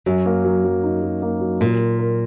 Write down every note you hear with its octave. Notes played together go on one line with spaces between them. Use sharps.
F#2 F#3
A#3
F#3
F#3
D#4
F#3
A#3
F#3
A#2 A#4
F#3
A#4